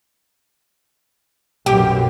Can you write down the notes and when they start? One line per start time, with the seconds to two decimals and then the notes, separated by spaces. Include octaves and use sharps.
1.66 B1 F#2 B2 G4